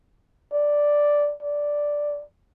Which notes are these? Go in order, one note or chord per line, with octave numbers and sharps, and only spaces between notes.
D5
D5